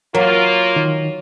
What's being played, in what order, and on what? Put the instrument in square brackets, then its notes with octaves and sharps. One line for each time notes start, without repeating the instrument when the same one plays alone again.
[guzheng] F#3 [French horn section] A#3 F4 [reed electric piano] A#4
[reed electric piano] D#3